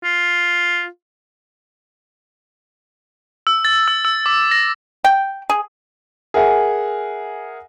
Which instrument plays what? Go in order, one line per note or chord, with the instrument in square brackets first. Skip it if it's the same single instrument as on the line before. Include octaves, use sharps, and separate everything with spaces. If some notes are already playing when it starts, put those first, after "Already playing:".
[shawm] F4
[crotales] E6
A6
E6
E6
D6
A#6
[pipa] G5
G#4
[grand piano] G#4 A#4 E5 F#5 G#5